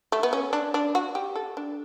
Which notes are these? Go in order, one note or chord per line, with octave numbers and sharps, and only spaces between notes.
A3
B3
C#4
D4
D4
F#4
G4
A4
D4